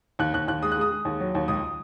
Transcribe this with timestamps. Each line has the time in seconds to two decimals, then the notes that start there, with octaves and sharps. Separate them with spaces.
0.19 D#2 F#6
0.34 D#2 F#6
0.48 D#2 F#6
0.62 G#3 D#6
0.72 F#6
0.77 G#3 D#6
0.91 G#3
1.05 D#2
1.20 F#3
1.35 D#2
1.48 C#2 D#6